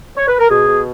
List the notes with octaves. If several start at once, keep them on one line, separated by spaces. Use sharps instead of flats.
C#5
B4
A#4
B2 G#4
B2